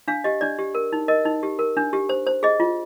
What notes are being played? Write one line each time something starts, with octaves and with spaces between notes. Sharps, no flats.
D4 F5
G4 D#5
D4 D5
G4
A#4
D#4
A#4 D#5
D#4
G4
A#4
D4
G4
C5
C5
G#4 D#5
F4